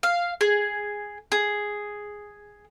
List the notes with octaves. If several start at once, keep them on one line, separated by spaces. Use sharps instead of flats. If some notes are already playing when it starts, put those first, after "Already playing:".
F5
G#4
G#4